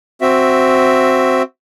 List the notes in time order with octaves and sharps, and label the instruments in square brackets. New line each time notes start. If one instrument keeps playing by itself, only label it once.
[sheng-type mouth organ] C4 F#4 E5